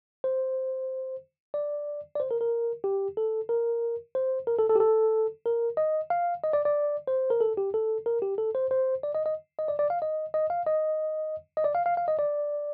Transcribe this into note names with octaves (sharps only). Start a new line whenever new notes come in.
C5
D5
D5
C5
A#4
A#4
G4
A4
A#4
C5
A#4
A4
A4
G4
A4
A#4
D#5
F5
D#5
D5
D5
C5
A#4
A4
G4
A4
A#4
G4
A4
C5
C5
D5
D#5
D#5
D#5
D5
D5
F5
D#5
D#5
F5
D#5
D#5
D5
F5
F5
F5
D#5
D5